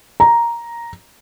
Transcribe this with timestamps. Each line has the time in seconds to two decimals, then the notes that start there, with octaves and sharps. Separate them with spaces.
0.20 A#5